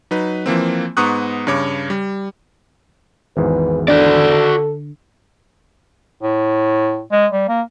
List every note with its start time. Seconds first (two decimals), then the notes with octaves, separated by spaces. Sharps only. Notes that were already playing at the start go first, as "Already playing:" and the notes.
0.11 F#3 D#4 B4
0.46 E3 F3 A#3 C4
0.97 G#2 B3 A#5 C#6 D#6 F#6
1.47 G2 C#3 C#5 D6
1.90 G3
3.37 G#1 E2 G#2 B4
3.88 D3 F#4 A4 D5
6.23 A2
7.12 G#3
7.32 G3
7.48 A#3